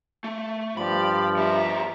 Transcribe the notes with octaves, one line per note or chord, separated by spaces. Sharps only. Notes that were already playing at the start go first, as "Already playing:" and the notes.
A3
G2 F3 G4 D5 B5
E2 G4 E5 A#5